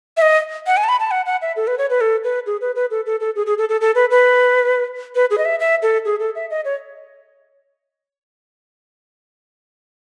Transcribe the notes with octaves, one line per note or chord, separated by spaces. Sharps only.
E5
D#5
F#5
G#5
A5
B5
A5
F#5
F#5
E5
A4
B4
C#5
B4
A4
B4
G#4
B4
B4
A4
A4
A4
G#4
G#4
A4
A4
A4
B4
B4
B4
G#4
D#5
E5
E5
A4
G#4
A4
E5
D#5
C#5